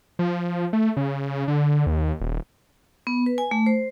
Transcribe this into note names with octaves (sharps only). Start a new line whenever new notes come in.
F3
A3
C#3
D3
D#2
D#1
B3
B4
G#5
A3
C5